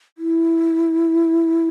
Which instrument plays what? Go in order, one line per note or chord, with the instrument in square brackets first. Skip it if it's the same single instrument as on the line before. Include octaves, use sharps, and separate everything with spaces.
[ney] E4